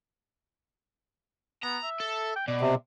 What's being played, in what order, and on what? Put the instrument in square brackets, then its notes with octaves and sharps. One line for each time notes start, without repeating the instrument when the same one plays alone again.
[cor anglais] B3 [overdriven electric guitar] A#5
[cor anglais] E5
[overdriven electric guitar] A4
[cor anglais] G5
[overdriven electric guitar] B2 [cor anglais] D5
[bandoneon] C3